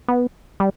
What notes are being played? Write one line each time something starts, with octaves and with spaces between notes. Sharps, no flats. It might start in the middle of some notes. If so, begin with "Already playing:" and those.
B3
G3